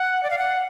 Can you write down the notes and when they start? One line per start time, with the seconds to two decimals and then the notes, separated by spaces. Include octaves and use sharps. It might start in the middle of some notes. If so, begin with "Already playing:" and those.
Already playing: F#5
0.23 D5
0.30 F5
0.38 F#5